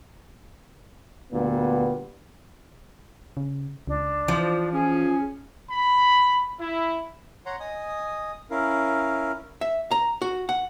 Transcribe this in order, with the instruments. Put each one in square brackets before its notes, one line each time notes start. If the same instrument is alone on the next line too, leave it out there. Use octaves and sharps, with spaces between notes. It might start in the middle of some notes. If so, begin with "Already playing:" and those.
[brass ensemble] D2 A#2 G3 B3
[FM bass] C#3
[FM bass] C#2 [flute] D4
[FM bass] E3 [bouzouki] F3
[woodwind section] C#4 [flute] G#4
[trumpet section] B5
E4
[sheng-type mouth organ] C#5 F#5 A#5 C6
D#5 G#5 D#6
C#4 E4 A#4 F5
[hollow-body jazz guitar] E5
A#5
F#4
F#5